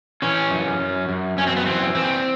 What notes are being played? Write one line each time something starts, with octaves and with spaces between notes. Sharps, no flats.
E3 C#4
F#2
F#2
F#2
F#2 C#4
C4
B3
E3 C4
E3 C4